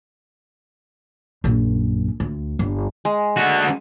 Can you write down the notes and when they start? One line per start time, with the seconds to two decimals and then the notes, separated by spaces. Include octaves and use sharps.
1.44 A#1 F#2
2.20 D2
2.59 G1
3.05 G#3
3.37 D3 F#4